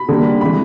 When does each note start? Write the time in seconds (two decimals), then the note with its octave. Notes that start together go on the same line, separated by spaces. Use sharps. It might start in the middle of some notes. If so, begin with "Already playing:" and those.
Already playing: B5
0.09 D3 G3 A#3
0.41 C3 E3 G#3 B5